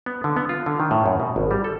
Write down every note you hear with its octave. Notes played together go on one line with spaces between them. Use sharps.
B3
D3
B3
F4
D3
D#3
A2
F#2
B2
G#1
G3
A4